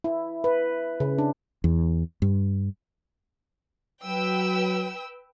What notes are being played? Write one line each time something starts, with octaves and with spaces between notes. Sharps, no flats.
E4
B4
C#3
D4
E2
G2
F#3 B4 G5 E6